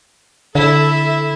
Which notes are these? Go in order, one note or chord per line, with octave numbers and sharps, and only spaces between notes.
D3 E4 A4 E5